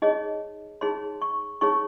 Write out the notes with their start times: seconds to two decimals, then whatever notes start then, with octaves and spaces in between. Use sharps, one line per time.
0.02 D#4 G#4 C#5 D#5
0.81 D#4 G#4 C#5 C6
1.22 C#6
1.61 D#4 G#4 C#5 C#6